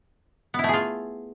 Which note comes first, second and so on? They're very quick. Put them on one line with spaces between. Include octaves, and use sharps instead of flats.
B3 E4 A3 G#4 F4